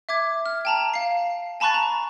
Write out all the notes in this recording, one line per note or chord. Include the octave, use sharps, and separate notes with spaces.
E5 D6 G#6
F6
G5 A5 A#5
F5 C7
G#5 A5 B5 C#6 F#6 A6
A#5